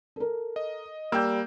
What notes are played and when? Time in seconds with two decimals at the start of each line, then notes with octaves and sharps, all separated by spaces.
0.16 A4 A#4
0.56 D#5
1.12 G3 A#3 G5 E6 G6